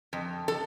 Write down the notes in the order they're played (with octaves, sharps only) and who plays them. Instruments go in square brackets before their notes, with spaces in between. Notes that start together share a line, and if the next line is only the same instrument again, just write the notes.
[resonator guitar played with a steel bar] F2
A4